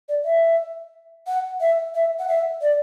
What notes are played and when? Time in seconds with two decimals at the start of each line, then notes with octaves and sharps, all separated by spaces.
0.09 D5
0.25 E5
1.27 F#5
1.61 E5
1.95 E5
2.19 F#5
2.28 E5
2.62 D5